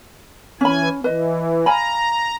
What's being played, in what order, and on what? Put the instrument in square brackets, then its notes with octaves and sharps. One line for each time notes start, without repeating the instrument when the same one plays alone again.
[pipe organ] E3 G#5 [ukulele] C#4 B5
[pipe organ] E3 [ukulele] B4 D#5
[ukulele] F5 G#5 B5 [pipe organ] A#5